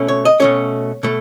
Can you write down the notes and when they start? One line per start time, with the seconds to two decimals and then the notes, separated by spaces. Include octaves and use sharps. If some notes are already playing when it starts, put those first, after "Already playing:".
Already playing: B2 A3 C#4
0.08 C#5
0.25 D#5
0.40 B2 A3 C#4 C#5
1.03 B2 A3